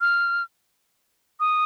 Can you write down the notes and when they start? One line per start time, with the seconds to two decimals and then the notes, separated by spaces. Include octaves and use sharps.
0.01 F6
1.40 D#6